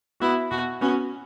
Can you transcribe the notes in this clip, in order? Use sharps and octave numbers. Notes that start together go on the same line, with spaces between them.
B3 E4 F#4
B2 F#4
B3 C#4 F#4